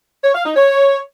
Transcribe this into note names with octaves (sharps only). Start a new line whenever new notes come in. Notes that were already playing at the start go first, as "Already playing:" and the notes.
C#5
F5
D#4
C#5